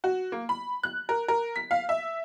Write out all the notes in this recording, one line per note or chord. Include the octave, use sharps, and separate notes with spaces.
F#4
A#3
B5
F#6
A#4
A#4
B6
F5
E5